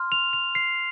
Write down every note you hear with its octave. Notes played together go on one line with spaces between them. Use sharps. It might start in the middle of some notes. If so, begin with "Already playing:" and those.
Already playing: C6 F6
F7
F7
C7